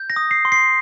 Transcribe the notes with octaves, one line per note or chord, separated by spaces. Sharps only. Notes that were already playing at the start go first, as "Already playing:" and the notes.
Already playing: G6
A#6
D#6
C7
C6
C7